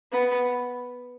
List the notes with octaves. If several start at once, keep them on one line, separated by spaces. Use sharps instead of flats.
B3